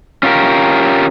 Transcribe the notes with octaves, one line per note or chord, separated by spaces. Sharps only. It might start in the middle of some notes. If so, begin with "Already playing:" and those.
C#4 F4 G4 A#4